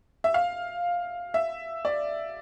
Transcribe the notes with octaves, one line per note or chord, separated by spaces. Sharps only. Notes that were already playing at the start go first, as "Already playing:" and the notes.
E5
F5
E5
D5